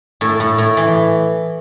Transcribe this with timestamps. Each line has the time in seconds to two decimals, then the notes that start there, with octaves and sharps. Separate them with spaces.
0.21 A2 A4
0.40 A2
0.58 A2
0.77 E3